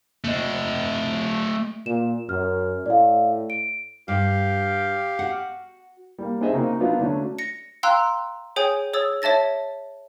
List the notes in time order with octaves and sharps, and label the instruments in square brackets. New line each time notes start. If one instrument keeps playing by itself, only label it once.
[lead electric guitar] A3 D#5
[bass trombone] A#2 [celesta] E7
[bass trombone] F#2 [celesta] F6
[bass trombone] A2 [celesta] D5 F5
[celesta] D7
[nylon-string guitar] G2 G3 [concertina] G4 F5
[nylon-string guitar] F#4 F#5
[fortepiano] G3 A#3
C4 D4 D#4 G#4 D#5 E5
C#3 A#3 C4 D#4 F#4
F#3 B3 D4 D#4 F4
D3 F#3 A3 C#4 D4
[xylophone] A#6 C#7
F5 G5 A#5 C6 E6 F#6
G#4 C#5 G5 G#5 D#6 G6
G#4 C#5 D#6 E6 A6
C#5 E5 A5 A6 A#6